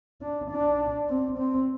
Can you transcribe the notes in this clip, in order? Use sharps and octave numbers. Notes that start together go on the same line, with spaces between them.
D4
D4
C4
C4